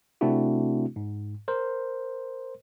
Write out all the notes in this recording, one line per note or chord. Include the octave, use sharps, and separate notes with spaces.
C3 A3 C4 D4 E4 F#4
G#2
A#4 C5